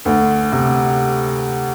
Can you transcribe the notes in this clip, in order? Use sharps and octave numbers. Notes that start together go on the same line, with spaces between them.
D2
C3